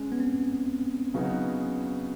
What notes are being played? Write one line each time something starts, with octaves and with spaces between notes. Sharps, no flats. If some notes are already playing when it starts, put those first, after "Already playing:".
Already playing: G#3 C#4
B3
C4
C#3 F#3 B3 D#4 F#4